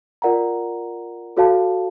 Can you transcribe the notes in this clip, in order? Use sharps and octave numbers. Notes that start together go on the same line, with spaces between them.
F4 A#4 D5 F#5 A#5
F#4 A4 C#5 F5 A5